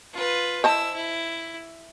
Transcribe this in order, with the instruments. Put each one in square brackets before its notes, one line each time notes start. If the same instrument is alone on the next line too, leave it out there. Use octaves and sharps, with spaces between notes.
[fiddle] F4 B4
[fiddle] E4 E6 [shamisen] C5 D#5 A5
[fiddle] E4